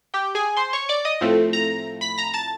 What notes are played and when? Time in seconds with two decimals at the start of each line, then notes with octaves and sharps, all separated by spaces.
0.14 G4 G5
0.35 G#4 G#5
0.57 C5 C6
0.73 C#5 C#6
0.89 D5 D6
1.05 D#5 D#6
1.21 A2 F3 A3 C4
1.53 A#5 A#6
2.01 B5 B6
2.18 A#5 A#6
2.34 A5 A6